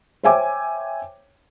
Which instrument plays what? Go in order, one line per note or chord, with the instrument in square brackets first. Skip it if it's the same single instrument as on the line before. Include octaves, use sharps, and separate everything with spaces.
[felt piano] C5 C#5 E5 G5 G#5 D6